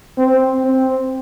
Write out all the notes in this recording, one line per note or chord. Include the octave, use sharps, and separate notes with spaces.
C4
C4